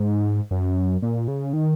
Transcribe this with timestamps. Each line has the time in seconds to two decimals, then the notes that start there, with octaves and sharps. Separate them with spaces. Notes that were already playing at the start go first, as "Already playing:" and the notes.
Already playing: G#2
0.51 F#2
1.02 A#2
1.28 C#3
1.53 D#3